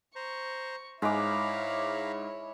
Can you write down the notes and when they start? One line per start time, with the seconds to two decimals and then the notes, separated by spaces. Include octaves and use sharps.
0.15 C5 A#5 C#6
1.02 G#2 G#3 E4 C#5 F5 A#5 B5 D6